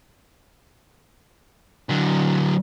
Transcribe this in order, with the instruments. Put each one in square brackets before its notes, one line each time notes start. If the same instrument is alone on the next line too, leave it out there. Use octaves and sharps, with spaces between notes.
[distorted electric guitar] D3 F#3